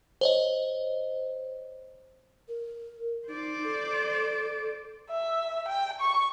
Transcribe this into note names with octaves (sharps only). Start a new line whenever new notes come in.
C5 C#5 D#5
A#4
D#4 C5 D5
A4
E5
G5
C#6